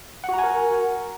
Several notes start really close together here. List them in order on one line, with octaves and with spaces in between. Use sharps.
F#5 F#4 A#5 G#5 A#4